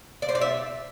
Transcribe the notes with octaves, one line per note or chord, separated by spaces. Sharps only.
D5
C5
D5
E5